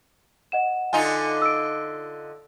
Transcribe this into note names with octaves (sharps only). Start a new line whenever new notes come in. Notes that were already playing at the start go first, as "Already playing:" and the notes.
D#5 F#5 E7
D3 D#4 F4 G#5
E6 D7